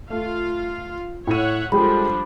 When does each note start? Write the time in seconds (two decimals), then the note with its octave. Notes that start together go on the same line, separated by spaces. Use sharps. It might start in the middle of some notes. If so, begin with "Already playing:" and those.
0.10 A3 F4 F5
1.27 A2 C#5 E5 F#5 D#7
1.72 F3 G3 G#3 D4 G4 A4 B5